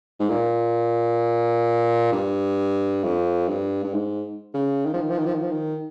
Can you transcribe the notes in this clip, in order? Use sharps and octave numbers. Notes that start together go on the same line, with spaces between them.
G#2
A#2
G2
F2
G2
G2
G#2
C#3
D#3
F3
D#3
F3
D#3
F3
D#3
F3
D#3